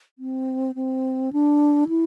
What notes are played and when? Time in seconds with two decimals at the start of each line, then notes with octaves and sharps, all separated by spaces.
0.19 C4
0.75 C4
1.33 D4
1.89 E4